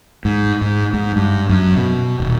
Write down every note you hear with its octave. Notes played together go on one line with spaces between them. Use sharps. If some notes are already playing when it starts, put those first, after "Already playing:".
G#2
G#2
G#2
G2
F#2
B2
D#1